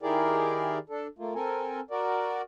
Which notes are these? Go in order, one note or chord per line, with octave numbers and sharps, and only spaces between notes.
D#3 E4 G4 G#4 A#4 D5
D4 A4
A3 A#3 F4
C4 A4 A#4 G#5
F#4 A#4 D5